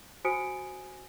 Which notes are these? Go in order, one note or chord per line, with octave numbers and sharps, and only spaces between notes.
F#4 C5 G#5 D#6 C#7 D7